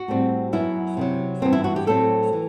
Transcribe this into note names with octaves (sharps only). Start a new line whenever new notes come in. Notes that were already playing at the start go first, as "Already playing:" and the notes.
Already playing: F#4
A2 G3 C4
F#2 F#3 B3 E4
C3 D#3 F#3
G2 E3 B3 C4
E4
F#4
G4
A2 F#3 A3 C4 A4
E3